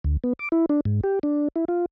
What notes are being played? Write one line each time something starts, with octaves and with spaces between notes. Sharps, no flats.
D2
B3
D6
E4
D4
G#2
G4
D4
E4
F4